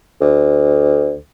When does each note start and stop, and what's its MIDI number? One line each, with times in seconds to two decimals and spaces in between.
0.21 1.16 38